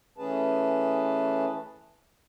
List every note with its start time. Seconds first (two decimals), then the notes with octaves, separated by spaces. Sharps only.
0.18 E3 A3 C#4 G#4 B4 A5